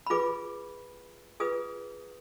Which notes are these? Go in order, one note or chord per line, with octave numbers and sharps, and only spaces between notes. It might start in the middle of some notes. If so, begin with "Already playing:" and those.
B5
F4 G#4 B4 D6
F4 G#4 B4 D#6